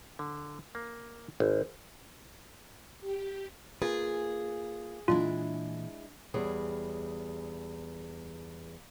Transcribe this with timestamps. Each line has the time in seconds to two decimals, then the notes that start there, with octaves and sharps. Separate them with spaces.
0.19 D3
0.75 A#3
1.40 G#1
3.01 G4
3.82 A#3 F4 G#4 B4
5.08 A#2 E3 G#3 D4 E4 F4
6.34 E2 G3 G#4 C#5 G#5